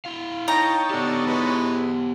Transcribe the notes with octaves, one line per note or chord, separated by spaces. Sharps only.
E4 F5
D#4 C#5 G5 A5 A#5
B3 D4 G4 A4
E3 G#3 B4